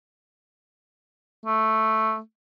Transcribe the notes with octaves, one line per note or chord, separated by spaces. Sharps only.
A3